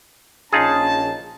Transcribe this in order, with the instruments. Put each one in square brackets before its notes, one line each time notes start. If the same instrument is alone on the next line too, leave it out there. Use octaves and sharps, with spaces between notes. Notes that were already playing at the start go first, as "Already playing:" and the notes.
[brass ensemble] A#1 C#4 A5 [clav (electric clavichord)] D#4 F4 G#4